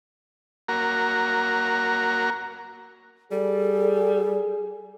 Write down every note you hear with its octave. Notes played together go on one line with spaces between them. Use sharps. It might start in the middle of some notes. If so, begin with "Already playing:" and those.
A#3 F#4 A#4
G3 G#4 A4